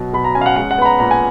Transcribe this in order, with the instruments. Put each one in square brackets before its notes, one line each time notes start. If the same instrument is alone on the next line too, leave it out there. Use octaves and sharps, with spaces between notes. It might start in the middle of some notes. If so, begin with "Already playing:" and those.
Already playing: [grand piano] B2 F#3
B2 B5
A#5
C#4 G#5
F5
F#5
G#3 F#5
F#5
B3 B5
A#5
A#2 A#5
G#5